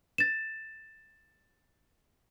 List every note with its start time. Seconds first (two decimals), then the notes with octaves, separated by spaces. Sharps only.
0.18 A6 E7